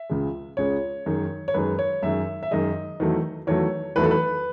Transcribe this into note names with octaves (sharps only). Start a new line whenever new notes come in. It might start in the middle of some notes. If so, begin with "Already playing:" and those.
Already playing: E5
C#2 C#3 G#3
C#2 C#3 G#3 C#5
F#2 D#3 G#3
C#5
F#2 D#3 G#3 B4
C#5
F#2 D#3 G#3 E5
E5
F#2 D#3 G#3 D#5
E2 D#3 F#3 A3
E2 D#3 F#3 A3 C#5
E2 D#3 F#3 A3 B4
A4
B4